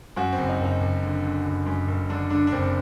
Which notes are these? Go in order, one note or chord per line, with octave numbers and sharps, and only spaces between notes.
F#2 F#4
C4
F#1
D#4
F#1 D#4
F#1
D3
D3
F#1
F#2
F#1
D3 D4
D3 D4
D4
F#1 C4